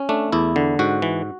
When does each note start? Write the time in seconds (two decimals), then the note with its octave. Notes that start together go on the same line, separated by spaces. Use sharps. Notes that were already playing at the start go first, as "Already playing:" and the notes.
Already playing: C#4
0.09 A3 D4
0.32 E2 E4
0.56 D3
0.79 G#2 F#4
1.02 E3